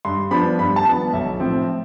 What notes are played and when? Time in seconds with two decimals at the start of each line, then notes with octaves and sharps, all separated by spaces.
0.05 G2 C6
0.31 F3 B3 D4 B5
0.59 G2 B5
0.76 A5
0.85 F3 B3 D4
1.13 B1 E5
1.40 A2 F3 C4